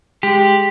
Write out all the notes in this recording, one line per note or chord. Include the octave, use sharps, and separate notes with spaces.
G#3 G4